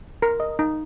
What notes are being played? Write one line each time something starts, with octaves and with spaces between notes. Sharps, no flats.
A#4
D#5
D#4